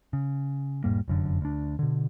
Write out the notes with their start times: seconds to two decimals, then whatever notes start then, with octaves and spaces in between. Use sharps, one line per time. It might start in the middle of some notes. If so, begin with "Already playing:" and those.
0.13 C#3
0.84 E1 G#2 G3 A#3
1.08 F1 F#2 D3
1.41 D2 D4
1.79 B2 D3